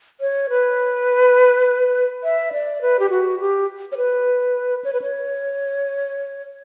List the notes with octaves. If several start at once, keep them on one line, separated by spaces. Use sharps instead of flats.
C#5
B4
E5
D5
B4
G4
F#4
G4
C#5
B4
C#5
B4
C#5